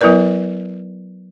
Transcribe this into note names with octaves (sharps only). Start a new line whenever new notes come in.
F#3 B3 E4 A#4 B4 D5